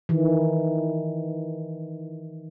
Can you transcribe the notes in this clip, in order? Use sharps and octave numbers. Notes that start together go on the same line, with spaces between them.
D#3 E3